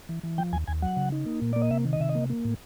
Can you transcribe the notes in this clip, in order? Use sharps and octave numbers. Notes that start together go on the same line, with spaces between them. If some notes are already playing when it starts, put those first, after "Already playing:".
E3
E3
F3 G5
D#2 G#5
D#2 G#5
F#3 F#5
C#3
D#4
A#3
A#2
A#3 D5
D#5
C3 E5
D#3
D#5
C3 E5
D#5
A#3
A#3
A2